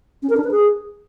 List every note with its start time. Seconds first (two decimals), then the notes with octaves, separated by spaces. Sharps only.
0.22 C#4
0.30 A#4
0.37 D4
0.44 B4
0.51 G#4